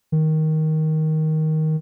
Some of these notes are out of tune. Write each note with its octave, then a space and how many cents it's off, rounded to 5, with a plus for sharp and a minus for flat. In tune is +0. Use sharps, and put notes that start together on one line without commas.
D#3 +10